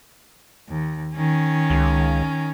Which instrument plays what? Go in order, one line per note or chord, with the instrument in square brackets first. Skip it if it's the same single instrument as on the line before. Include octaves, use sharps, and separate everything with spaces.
[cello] D#2
D#3 C#4
[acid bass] C#2